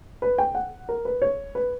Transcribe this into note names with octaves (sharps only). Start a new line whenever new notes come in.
B4
G5
F#5
A#4
B4
C#5
B4